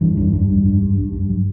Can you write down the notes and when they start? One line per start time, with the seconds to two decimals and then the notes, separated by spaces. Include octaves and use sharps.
0.01 G2 E3
0.17 G2
0.33 G2
0.49 G2
0.65 G2
0.81 G2
0.98 G2
1.13 G2
1.29 F#3